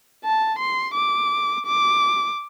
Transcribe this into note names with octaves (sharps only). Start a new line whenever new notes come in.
A5
C6
D6
D6